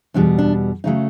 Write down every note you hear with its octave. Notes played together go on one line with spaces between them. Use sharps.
E2 B2 G3 D4
D4
C#3 F#3 A3 D#4